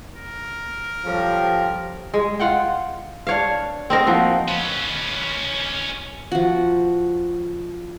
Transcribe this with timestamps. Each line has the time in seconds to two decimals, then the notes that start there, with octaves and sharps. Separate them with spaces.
0.16 A#4
1.05 F3 G3 C#4 G4 A4
2.14 G#3
2.39 F4 F#5 G5
3.27 D4 C#5 F5
3.90 C4 D#4 A#4 C5
4.06 F3 A#3 F#4
4.48 C#4 B4
6.32 F3 F#4